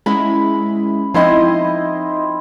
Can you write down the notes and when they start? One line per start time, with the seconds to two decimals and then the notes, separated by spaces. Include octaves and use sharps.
0.06 G#3 C#4 E4 B5
1.14 F3 C4 D#4 E4 D#5 C6